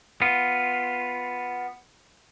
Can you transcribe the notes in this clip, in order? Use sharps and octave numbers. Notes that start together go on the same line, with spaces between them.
B3 F4